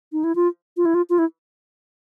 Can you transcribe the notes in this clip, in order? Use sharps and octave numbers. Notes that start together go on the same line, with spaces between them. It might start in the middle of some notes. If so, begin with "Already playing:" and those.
D#4
E4
F4
F4
E4
F4
F4
E4